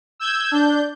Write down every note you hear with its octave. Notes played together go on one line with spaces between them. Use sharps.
E6 G6 G#6
D4 G6